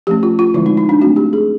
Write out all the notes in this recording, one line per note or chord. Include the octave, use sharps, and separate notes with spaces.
F3 A3 C#4 G4
F4
F4
D3 F3 G#3 C4 E4
D#4
D#4
D4
F#3 A3 C4 F#4
G4
G#4